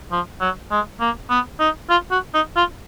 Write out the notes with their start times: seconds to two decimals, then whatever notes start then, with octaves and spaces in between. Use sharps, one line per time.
0.12 F3
0.41 F#3
0.71 G#3
1.01 A#3
1.30 B3
1.60 D#4
1.90 F4
2.11 F#4
2.34 D#4
2.56 F4